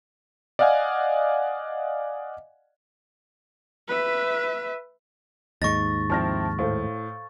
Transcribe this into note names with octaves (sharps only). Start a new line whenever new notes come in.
D5 D#5 F5 F#5 G#5
B4 E5
D#2 G#2 D#5 C#6 A6 A#6
F3 C4 E4 A5 F6 A#6
A2 A4 C5 F5